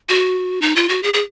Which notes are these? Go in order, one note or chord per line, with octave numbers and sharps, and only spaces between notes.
F#4
D#4
F4
F#4
G#4
G#4